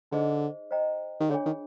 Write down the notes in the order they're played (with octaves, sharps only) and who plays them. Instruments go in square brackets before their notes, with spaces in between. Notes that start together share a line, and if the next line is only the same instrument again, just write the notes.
[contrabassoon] D3 [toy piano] D#4 G#4 C5 D#5
[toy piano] C5 D#5 G5 A#5
[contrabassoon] D#3
[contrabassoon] D3 [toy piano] D4 F4 G#4 C#5
[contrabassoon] D#3